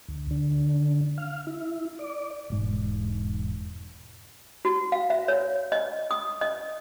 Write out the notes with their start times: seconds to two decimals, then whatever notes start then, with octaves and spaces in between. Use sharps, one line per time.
0.08 D2
0.31 D3
1.18 F5
1.47 E4
1.99 D5
2.50 E1 G#2
4.65 F#4
4.92 F5
5.10 E5
5.28 C#5
5.72 D#5
6.11 D#6
6.41 D#5